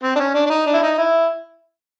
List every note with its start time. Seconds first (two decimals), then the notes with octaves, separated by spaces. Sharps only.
0.03 C4
0.15 D4
0.20 C#4
0.34 D4
0.46 D4
0.50 D#4
0.66 D4
0.74 E4
0.82 D#4
0.98 E4